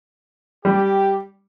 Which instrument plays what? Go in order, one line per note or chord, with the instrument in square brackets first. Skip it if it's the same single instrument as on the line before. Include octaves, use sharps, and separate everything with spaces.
[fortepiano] G3 [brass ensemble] G4